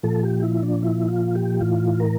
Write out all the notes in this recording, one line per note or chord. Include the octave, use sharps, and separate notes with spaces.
A#2 F3 A4
G4
E4
D4
E4
F4
G4
A2 E3 F4
A#4